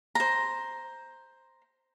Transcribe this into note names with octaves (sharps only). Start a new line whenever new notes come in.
C5 A#5